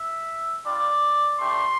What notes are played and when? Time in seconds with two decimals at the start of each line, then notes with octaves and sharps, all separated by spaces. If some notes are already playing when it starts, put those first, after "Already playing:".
Already playing: E5
0.64 G3 D4 F4 D5
1.38 A3 D4 G4 C6